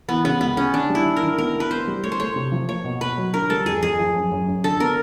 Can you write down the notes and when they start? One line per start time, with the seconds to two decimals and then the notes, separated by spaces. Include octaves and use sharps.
0.08 E3 B3
0.24 C#3 B3
0.41 C#2 B3
0.57 C#3 C#4
0.73 D#3 D4
0.89 G3
0.95 E4
1.06 D#3
1.16 A#4
1.23 D#3
1.38 B3 A#4
1.55 B3 B4
1.71 B3 C5
1.87 G3
2.04 A3 C#5
2.12 C5
2.20 A3 C#5
2.36 C3
2.52 F3
2.69 A#3 C#5
2.84 B2
3.01 B2 B4
3.17 F#3
3.34 D3 A#4
3.50 G3 A4
3.66 F2 G#4
3.82 F2 G#4
3.99 F3
4.15 F#2
4.31 F#2
4.48 F#2
4.64 D3 A4
4.80 B3 A#4